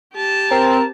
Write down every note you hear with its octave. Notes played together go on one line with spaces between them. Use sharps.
G4 A5
C4 A#4